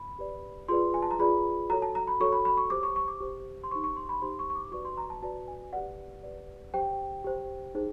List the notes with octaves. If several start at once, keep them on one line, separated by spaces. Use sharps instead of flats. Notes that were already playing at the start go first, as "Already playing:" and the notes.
Already playing: B5
G4 B4 D5
F4 G#4 B4 D5 C6
G#5
A5
A#5
F4 G#4 B4 D5 B5
F#4 A4 C#5 A#5
A5
A#5
B5
F#4 A4 C#5 C#6
B5
B5
C#6
G4 C5 D6
C#6
C#6
D6
G4 C5
C6
D#4 G4 C5 C#6
C#6
C6
B5
D#4 G4 C5 C6
C#6
C#6
D6
F#4 B4 D5 C#6
C6
A#5
A5
F#4 B4 D5 A5
G#5
G4 B4 D5 F#5
G4 B4 D5
G4 C5 G5
G4 C5
D#4 G#4 C5